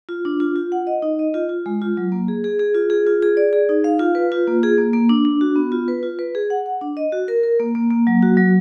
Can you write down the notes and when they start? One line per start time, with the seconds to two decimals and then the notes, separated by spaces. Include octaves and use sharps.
0.09 F4
0.25 D4
0.40 F4
0.56 F4
0.72 F#5
0.87 D#5
1.02 D#4
1.19 D#5
1.34 F4
1.49 F4
1.66 G#3
1.82 F4
1.97 F#3
2.12 A#3
2.28 G#4
2.44 G#4
2.59 G#4
2.75 F4
2.90 G#4
3.07 F4
3.22 G#4
3.37 D5
3.53 G#4
3.69 D#4
3.84 F5
3.99 F4
4.15 B4
4.32 F4
4.47 A#3
4.63 G#4
4.78 A#3
4.93 A#3
5.10 D4
5.25 D4
5.41 F#4
5.56 B3
5.72 F4
5.88 B4
6.03 F4
6.19 B4
6.35 G#4
6.50 F#5
6.66 F#5
6.81 D4
6.97 D#5
7.12 F#4
7.28 A#4
7.43 A#4
7.60 A#3
7.75 A#3
7.91 A#3
8.07 F#3
8.22 F#4
8.37 F#3